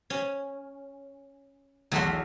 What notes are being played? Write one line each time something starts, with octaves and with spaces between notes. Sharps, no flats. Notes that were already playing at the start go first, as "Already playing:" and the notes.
C#4
B1 E2 A3 F#4 C6 G#6